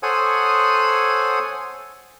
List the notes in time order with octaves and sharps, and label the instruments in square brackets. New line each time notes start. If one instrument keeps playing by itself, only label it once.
[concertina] A4 C5 C#5 F#5 G#5 D#6